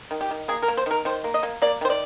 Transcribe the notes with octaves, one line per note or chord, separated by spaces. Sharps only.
D#3
G4
D#3
A#3 G#4
A#4
A#3
C5
D#3 A#4
D#3 C5
A#3
D#5
A#3
A#3 D5
D#3 C5
D5